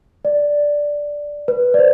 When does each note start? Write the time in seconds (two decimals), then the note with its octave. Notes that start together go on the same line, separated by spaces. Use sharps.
0.25 D5
1.48 B4
1.74 D5
1.79 C5